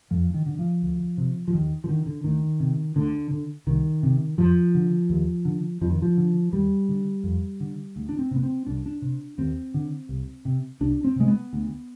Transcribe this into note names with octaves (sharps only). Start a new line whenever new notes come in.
F2 F3
D#3
D3
F3
D2
C3
F3
D#2 D#3
F3
D3 D#3
D3
D2 D#3
C3
D2 D3
D3
C2 D#3
C3
F2 F3
D3
D#2
D3
F2 F3
D#3
F3
D3
D#2 G3
D3
F2
D3
D2
D4
C4
C3 B3
C4
C2 D4
D4
C3
D#2 C4
D3
C2
C3
C2 D4
C4
C3 G#3
B3
D2